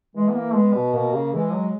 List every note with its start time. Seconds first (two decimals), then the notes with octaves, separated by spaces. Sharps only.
0.15 E3 G#3
0.29 B3
0.36 A#3
0.54 G#3 B3
0.75 B2
0.94 B2 A#3
1.14 C#3
1.34 E3 G#3
1.53 F#3